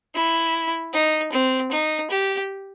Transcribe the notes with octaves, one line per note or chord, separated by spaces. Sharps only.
E4
D#4
C4
D#4
G4